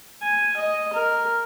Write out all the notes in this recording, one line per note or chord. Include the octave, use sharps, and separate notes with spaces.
G#5
D#5
A#4